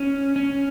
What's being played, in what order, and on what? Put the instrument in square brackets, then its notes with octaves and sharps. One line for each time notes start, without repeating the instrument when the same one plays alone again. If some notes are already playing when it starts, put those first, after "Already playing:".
Already playing: [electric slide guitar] C#4
C#4